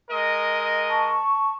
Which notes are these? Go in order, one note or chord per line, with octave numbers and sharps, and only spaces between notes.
G#3 A#4 D#5
A5 C#6